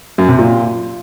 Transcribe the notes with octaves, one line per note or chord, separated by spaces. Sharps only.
F#2
C3
A#2